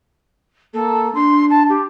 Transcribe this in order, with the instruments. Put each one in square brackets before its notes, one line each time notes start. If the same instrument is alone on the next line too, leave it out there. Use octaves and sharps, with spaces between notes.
[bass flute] A#3 [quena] A4
[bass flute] D4 [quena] C6
[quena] A5
G4